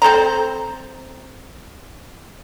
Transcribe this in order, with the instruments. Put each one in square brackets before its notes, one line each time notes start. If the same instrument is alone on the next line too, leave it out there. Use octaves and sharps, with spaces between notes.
[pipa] C4 A4 C5 A#5